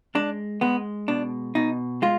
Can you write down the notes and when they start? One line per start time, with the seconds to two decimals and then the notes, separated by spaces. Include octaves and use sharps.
0.15 G#3 D4
0.61 G#3 B3
1.08 B2 D4
1.55 B2 D#4
2.02 G#3 F4